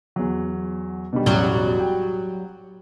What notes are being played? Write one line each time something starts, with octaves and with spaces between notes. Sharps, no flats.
E2 F#3
B2 D3 G3
E1 A1 F#3 G3 G7
G5